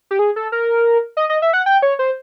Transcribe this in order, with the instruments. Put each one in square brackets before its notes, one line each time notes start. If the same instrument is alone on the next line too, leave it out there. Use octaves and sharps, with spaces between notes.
[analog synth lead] G4
G#4
A4
A#4
D#5
D#5
E5
F#5
G5
C#5
C5